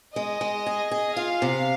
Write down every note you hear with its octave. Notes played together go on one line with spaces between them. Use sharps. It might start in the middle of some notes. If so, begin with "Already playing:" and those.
G#3 D#5
G#3
G#4
G#4
F4 F5
C3